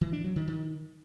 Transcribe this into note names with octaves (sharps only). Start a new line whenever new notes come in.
E3
D4
F#3
D#3
D#3